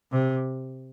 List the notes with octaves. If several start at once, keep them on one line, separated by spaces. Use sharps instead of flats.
C3